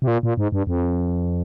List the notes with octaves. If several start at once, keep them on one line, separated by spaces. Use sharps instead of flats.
C3
A#2
A#2
G#2
G2
F2